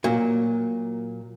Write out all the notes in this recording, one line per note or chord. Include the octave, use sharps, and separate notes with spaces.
A#2 F#3